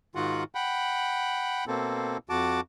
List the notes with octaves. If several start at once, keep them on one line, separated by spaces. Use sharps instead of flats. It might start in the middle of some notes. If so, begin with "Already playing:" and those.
G#2 D#3 F4 F#4 F#5
F#5 G5 B5
B2 A#3 C4 A4
F2 F#4 A5 D6